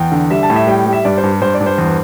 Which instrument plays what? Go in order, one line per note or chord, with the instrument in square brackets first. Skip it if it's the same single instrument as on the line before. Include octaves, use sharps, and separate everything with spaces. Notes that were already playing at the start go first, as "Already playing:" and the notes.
Already playing: [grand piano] E2 G5
D3
G3 E5
A5
A2
E5
G3 G5
G5
G3
E5
G2 D5
C5
G2
G2 C5
D5
G2
C5
E2